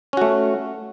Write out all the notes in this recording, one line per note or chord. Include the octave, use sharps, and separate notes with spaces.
A3 C#4 F#4